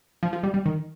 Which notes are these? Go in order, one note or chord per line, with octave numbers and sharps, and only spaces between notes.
F3
F3
G3
G3
D#3